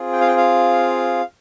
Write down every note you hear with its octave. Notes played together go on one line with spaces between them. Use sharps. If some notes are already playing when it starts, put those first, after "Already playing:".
Already playing: C4 F4 G#4
G5
F5
G5
F5